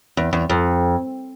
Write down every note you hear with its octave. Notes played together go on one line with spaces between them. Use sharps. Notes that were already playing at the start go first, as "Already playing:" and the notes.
E2
E2
F2